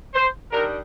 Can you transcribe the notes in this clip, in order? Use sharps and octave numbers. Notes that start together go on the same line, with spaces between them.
C5
D#3 G3 D4 A#4